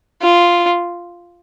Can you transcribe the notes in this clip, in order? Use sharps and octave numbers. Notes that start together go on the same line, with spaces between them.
F4